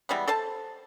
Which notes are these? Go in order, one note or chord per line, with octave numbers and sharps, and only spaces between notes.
E3 G3 G#3 B3
A4 C5 A5